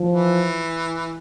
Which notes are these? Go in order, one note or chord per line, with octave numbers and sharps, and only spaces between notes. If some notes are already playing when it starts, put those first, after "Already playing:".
Already playing: F3
E3